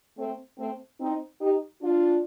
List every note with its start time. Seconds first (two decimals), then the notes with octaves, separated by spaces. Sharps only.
0.17 A3 C4
0.58 A3 C4
1.00 C4 D#4
1.41 D#4 G4
1.82 D4 F4